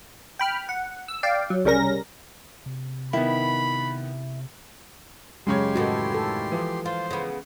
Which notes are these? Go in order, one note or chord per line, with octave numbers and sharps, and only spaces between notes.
G5 B5 F6
F#5
E6
D5 F5 G5
F#3
C2 C#3 G3 C#4 A#4 A#6
C3
D#3 B3 E4 B5
F#2 C#3 G#3 G4 C#5 C6
E2 A2 D#3 F#4 A4
A4
E3 F3
F4 C5
C#3 B3